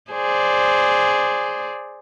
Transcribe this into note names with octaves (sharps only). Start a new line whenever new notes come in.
G#4 C5 D5